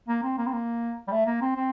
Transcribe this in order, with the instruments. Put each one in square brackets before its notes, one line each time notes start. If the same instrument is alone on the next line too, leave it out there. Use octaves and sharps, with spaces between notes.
[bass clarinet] A#3
C4
A#3
C4
A#3
G3
A3
A#3
C4
C4